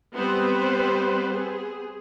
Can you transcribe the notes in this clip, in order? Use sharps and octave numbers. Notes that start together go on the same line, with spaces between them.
G3 B3 C4 B4 C5
G#4